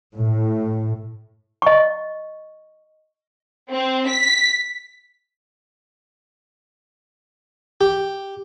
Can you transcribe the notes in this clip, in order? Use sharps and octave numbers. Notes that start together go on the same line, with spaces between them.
A2
D#5 C#6
C4
B6
G4